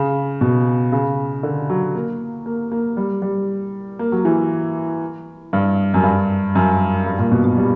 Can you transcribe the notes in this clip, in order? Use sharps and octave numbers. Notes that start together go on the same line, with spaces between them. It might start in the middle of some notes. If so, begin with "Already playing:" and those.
Already playing: C#3
B2
C#3
D3
F#3
A#3
A#3
A#3
G3
G3
A#3
F#3
E3
G2
F#2
G2
F#2
G2
A#2
B2
B2
G3